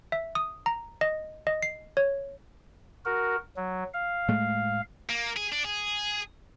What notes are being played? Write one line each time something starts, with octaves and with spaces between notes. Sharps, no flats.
E5
D#6
A#5
D#5
D#5
C7
C#5
F#4 A#4
F#3
F5
A2 G#3 A3
A#3
G#4
D4
G#4